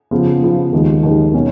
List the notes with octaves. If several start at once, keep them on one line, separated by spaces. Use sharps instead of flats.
C#3 F3 B3 F4
C#3 F3 B3 F4
D#2 D#3 G#3
D#2 D#3 G#3
B2 F#3 C#4